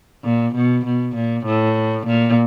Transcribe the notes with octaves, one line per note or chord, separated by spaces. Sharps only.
A#2
B2
B2
A#2
A2
A#2